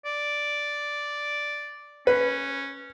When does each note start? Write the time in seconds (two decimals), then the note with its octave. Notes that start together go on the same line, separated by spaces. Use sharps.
0.05 D5
2.07 C#4 B4